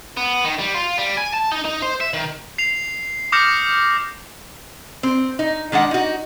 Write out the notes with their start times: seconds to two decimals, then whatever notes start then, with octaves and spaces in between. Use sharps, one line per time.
0.17 B3
0.45 D#3
0.59 G3
0.74 F4
0.98 G3
1.17 G#5
1.33 A5
1.51 D#4
1.65 D#4
1.82 C5
2.00 E5
2.13 D#3
2.58 C7 F7
3.32 D6 D#6 F6 G6 A#6 C#7
5.03 C4
5.39 D#4
5.72 D#3 G#3 D4 F#5
5.91 D#4 F#4